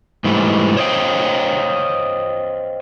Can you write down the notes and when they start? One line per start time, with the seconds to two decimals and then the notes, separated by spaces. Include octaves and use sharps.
0.24 G#2 E3 G3 A3
0.77 C5 C#5 D#5 F5 G5